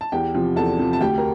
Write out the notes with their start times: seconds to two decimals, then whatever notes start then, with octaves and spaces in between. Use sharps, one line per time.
0.01 A5
0.12 E2 G4 G5
0.34 C3 F3
0.56 E2 A4 A5
0.79 C3 F3
0.93 A5
1.00 D2 G4 G5
1.18 A#4